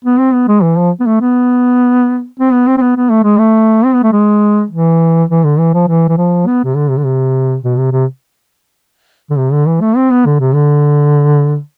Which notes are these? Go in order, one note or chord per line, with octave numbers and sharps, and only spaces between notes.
B3
C4
B3
G#3
E3
F3
B3
A3
B3
C4
B3
C4
C4
B3
B3
A3
G#3
A3
C4
B3
A3
G#3
E3
E3
D3
E3
F3
E3
E3
F3
B3
C3
D3
C3
D3
C3
B2
C3
C3
D3
C3
D3
E3
A3
C4
B3
D3
C3
D3